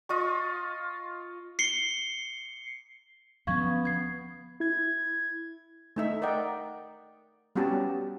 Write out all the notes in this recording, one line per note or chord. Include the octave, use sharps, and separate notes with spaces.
F4 D#5 C#6
C7 C#7 G7
D2 F3 B3 C#4 F5 C#6 G#6
G#6 C7
E4 G#6
A3 D#4 E5
A#4 D5 D#5 F#5 G5
G3 B3 C#4 F#4 G4 A5